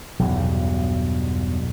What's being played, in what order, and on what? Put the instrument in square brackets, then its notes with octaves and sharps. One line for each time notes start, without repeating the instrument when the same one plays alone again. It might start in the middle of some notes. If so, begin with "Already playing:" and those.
[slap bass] B1 E2 G2